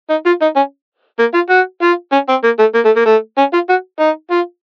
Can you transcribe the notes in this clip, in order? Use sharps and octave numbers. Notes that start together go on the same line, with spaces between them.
D#4
F4
D#4
C#4
A#3
F4
F#4
F4
C#4
C4
A#3
A3
A#3
A3
A#3
A3
C#4
F4
F#4
D#4
F4